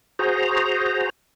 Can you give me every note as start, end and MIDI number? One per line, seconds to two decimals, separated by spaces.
0.19 1.09 66
0.19 1.09 68
0.19 1.09 72
0.19 1.09 82